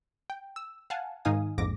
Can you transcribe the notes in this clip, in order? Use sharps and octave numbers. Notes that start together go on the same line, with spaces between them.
G5
E6
F5 F#5 G#5 A5
G#2 D#3 D#4 F5 G#5 D#6
A#1 F2 G#2 D6 A#6